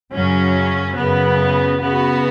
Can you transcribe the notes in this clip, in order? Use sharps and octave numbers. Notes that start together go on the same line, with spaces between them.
F#2 C#3 F#3 C#4
F#2 C#3 B3
C#3 B3 F#4